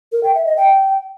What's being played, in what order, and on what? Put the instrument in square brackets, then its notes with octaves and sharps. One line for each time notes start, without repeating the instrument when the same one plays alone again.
[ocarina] A#4
G5
E5
D#5
G5